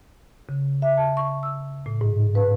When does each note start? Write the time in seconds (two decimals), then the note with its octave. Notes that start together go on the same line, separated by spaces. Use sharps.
0.49 C#3
0.82 E5
0.97 A5
1.17 C#6
1.43 E6
1.86 A2
2.01 G#2
2.35 B4